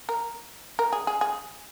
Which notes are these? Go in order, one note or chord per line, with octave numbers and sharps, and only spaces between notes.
A#4
A#4
G#4
G#4
G#4